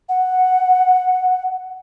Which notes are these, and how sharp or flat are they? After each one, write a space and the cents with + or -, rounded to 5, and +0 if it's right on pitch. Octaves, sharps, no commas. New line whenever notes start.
F#5 +0